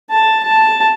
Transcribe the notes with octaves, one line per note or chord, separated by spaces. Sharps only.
A5
A5